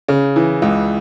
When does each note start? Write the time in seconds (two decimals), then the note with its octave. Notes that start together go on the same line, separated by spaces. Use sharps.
0.08 C#3
0.36 E3
0.62 C#2